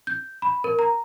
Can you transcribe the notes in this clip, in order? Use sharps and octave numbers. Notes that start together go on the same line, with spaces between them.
G6
B5
A#4
A#5